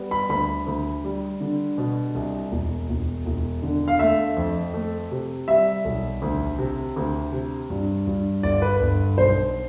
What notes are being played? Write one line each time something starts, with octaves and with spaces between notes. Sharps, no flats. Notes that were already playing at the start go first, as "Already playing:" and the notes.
Already playing: G3 B3
B5
D2 B5
D2
G3
D3
B2
C2
E1
E1
E1
D3
F5
A3 E5
F2
A3
C3
G3 E5
B1
D2
C3
D2
C3
G2
G2
G1 D5
B4
G1
B1 C5